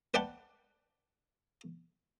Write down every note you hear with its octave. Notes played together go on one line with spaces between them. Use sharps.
B4 D5 F#5 G5 A5